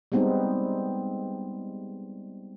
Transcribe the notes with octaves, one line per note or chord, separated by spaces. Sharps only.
G3 G#3 B3 C4 D#4